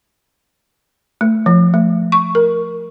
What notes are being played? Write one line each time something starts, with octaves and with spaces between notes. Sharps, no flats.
A3
F3
A3
C#6
A#4